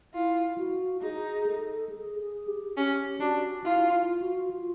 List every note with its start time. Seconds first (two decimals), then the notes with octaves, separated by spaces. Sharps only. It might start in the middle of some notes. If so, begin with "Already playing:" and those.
0.14 E4 F4
0.58 F#4
1.02 D#4 G#4
1.46 A4
1.89 G#4
2.19 G#4
2.48 G4
2.77 C#4 G4
3.20 D4 F#4
3.64 E4 F4
3.94 F4
4.22 F#4
4.51 F4